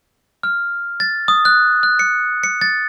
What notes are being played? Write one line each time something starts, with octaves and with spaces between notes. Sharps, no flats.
F6
A6
D#6
F#6
F#6
C#7
C#7
A6